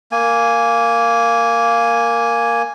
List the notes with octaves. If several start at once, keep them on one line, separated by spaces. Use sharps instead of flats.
A#3 G#5